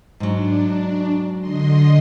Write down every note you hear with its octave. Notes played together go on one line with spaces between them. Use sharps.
G#2 F#3 D4
D3 D#5 C6